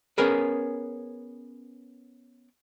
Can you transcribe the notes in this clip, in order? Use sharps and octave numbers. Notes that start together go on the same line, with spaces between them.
B3 C#4 G#4 A#4 B4